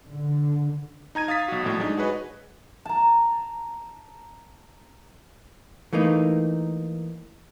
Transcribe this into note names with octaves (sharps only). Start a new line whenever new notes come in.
D3
D#4 A#5 G#6 D#7
F5 D#6 A6 B6
B1 F#4
A#1 A2 F#3
G#3 D4 D#4
F#4 G#4 B4 C#5 D#5
A5 A#5
E3 A3 A#3 D#4